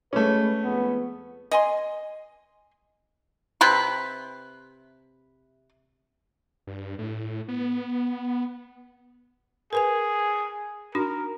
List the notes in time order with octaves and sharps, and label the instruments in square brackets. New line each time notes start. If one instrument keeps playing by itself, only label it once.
[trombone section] G#3 B4 [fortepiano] A3 C#4
[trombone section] F2 G#3 B3
[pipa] D#5 G#5 C6
C3 B4 C6
[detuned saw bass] G2
A2
B3
[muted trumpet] G#4 [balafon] A#4 B4 G#5
[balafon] D4 D#4 F#4 [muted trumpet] A#4